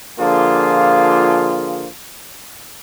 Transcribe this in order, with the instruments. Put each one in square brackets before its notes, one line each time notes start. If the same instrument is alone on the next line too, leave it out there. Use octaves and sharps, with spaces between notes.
[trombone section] D3 F3 A#3 F4 G#4